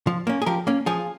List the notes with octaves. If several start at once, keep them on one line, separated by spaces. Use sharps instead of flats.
F3
A#3 C#4
G#4
F3 G4 A#4
A#3 C#4
F3 F4 G#4